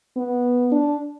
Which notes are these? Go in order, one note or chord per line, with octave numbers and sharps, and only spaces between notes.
B3
D4